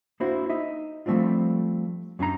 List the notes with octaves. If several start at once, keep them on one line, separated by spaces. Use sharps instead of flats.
A#3 D4 E4 F#4 C5
D#4 D#5 E5
F3 G3 A3 C4 D4 F4
F#2 C#4 D4 G#5 A#5